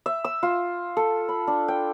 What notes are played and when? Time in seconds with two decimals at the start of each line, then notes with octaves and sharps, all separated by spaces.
0.06 E5
0.24 E6
0.43 F4
0.97 A4
1.29 B5
1.47 D4
1.68 G5